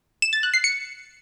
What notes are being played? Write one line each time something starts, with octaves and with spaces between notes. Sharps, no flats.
E7
A6
F#6
C7
C#7